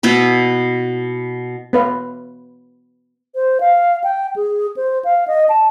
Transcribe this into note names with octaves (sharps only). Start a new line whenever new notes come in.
B2 B3 E4 B4
B3 B4 F5
C5
F5
G5
G#4
C5
F5
D#5
A5